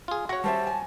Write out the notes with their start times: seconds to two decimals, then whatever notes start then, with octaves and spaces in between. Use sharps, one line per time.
0.08 F4 G#4
0.29 F#4 C#5 F#5 A#6
0.44 G3 C5 E5 A5
0.67 G#5